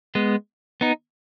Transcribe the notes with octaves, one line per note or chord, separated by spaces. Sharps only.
G#3 B3
B3 D#4